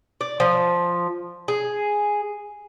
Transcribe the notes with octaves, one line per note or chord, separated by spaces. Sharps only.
D5
F3
G#4